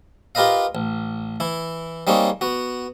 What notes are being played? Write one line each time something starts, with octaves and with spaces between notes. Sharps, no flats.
F4 G4 A#4 B4 D#5 F5
A1
E3 E4
G3 A#3 C4 D#4 G#4 C#5
B3 F#4